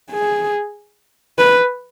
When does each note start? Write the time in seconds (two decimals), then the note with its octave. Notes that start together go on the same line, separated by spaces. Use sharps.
0.11 G#4
1.39 B4